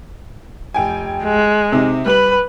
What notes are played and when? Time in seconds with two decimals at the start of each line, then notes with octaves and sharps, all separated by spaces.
0.74 F1 G5 G#5
1.24 G#3
1.72 C3 C4 D#4
2.06 G3 B4 B5 F#7